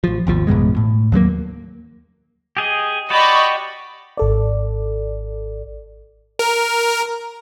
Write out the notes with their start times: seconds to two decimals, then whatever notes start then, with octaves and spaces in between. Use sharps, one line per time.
0.04 A1 F3
0.27 G#1 D#2 F3
0.47 A1 F#2 B2 G#3
0.77 A2
1.12 D#2 F#3 G#3 A#3
2.57 G4 G#4 D#5
3.10 F#4 G4 D5 D#5 B5 C#6
4.17 G#1 A4 D5
6.39 A#4